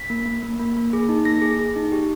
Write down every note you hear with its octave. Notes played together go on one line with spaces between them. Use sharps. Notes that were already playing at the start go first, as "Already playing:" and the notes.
Already playing: B6
A#3
A#3
A#3
A#3
A#3
G#4
D#4
A#3 A#6
G#4
G#4
D#4
G4